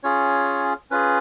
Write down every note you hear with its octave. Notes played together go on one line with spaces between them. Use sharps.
C#4 F4 G#4 C#5
C#4 F4 G#4 B4